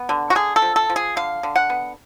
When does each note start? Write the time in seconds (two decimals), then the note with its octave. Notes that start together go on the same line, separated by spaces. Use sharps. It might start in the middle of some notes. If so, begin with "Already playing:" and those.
Already playing: B3
0.09 D3
0.30 F#4
0.35 D3 G#4
0.56 A4
0.62 F3
0.76 A4
0.90 F3
0.96 G#4
1.16 D3 F5
1.43 D3
1.56 F#5
1.70 B3